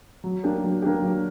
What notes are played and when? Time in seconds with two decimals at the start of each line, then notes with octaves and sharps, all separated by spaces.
0.24 F#3
0.44 A#3 D4 G4
0.64 F#3
0.82 A#3 D4 G4
1.02 F#3